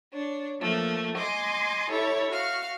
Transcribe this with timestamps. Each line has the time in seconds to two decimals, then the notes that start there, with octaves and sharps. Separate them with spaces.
0.13 D4 C#5
0.60 F3 A3 A#3
1.17 D#5 G#5 C6 D6
1.90 E4 G4 A4 C#5
2.30 F#4 F5 F6